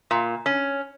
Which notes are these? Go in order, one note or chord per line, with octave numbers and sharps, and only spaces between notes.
A#2
C#4